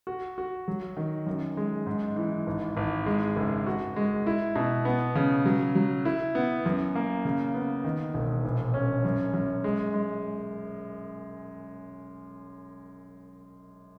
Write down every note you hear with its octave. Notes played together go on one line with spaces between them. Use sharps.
F#4
F#4
F#3
D#3
F#2
G#3
G#2
E3
G#1
G#1
G#3
F#1
F#4
G#3
E4
B2
B3
C#3
F#3
F#3
E4
B3
F#2
A#3
C#3
B3
D#3
E1
A#1
C#4
F#2
F#2
G#3
G#3